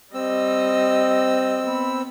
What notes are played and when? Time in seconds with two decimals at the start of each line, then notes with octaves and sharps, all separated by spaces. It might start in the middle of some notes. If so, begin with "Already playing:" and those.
0.14 G3 C4 D#5 E6
1.63 B3 B5